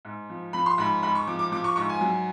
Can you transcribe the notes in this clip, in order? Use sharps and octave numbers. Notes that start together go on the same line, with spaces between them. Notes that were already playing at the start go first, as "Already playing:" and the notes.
G#2
F3
F3 B5
C6
G#2 B5
G#2 B5
C#6
F3 D6
D6
F3 D6
C#6
G#2 C#6
G#5
F#3